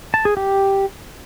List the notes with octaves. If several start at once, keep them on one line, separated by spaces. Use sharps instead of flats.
A5
G#4
G4